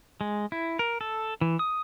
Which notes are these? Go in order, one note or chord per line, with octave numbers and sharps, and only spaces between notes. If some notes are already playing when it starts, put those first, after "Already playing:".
G#3
E4
A#4
A4
E3
D#6